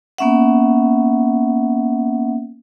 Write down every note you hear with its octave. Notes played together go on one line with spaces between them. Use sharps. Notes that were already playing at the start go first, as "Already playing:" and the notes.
A#3 B3 C#4 E5 F#5